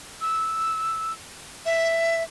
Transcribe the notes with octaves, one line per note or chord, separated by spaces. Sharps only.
E6
E5